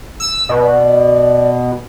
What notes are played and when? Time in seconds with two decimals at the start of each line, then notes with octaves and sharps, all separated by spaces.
0.20 E6
0.49 B2
0.62 D5